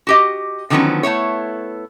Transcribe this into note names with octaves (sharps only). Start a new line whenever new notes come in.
F#4 G4 D#5
D3 D#3 F3 F#3 B3 C#4
A3 B3 E4 C#5